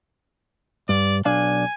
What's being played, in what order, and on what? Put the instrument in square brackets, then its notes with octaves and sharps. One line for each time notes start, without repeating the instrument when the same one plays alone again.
[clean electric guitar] G2 [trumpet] D5
[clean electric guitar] B1 D4 F5 [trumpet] G#5